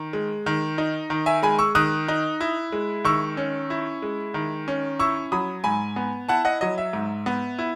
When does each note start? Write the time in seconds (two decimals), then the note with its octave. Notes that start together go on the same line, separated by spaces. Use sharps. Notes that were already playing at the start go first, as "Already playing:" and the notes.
Already playing: D#3
0.13 G#3
0.46 D#3
0.78 D#4
1.10 D#3
1.26 E5 G#5
1.42 G#3 G#5 B5
1.59 C#6 E6
1.75 D#3 D#6 F#6
2.08 D#4
2.41 E4
2.72 G#3
3.04 D#3 C#6 E6
3.37 C#4
3.70 E4
4.02 G#3
4.34 D#3
4.68 C#4
5.00 E4 C#6 E6
5.32 F#3 B5 D#6
5.64 G#2 G#5 B5
5.96 B3
6.29 E4 F#5 A5
6.45 D#5 F#5
6.61 F#3 D#5
6.78 E5
6.93 G#2
7.26 B3
7.59 E4